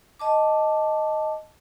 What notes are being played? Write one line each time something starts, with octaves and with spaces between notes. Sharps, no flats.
D#5 A5 D6